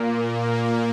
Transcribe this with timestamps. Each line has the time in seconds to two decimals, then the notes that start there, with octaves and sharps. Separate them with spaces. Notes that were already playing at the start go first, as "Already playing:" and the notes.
Already playing: A#2 A#3
0.40 A#3